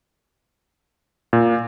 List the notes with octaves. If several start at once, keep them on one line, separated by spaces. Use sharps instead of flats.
A#2